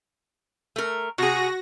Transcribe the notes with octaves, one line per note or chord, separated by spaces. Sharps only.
A3 A#4
C3 F#4 G#4 A#6